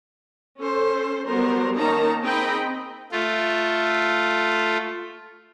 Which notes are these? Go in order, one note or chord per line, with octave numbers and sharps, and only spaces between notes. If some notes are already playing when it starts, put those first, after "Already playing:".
C#4 A4 C5
F#3 G3 B3 A#4 C5
D#3 A#3 C#4 D#4 A5 A#5
C4 D#4 G#4 D#5 G5 B5
A3 F4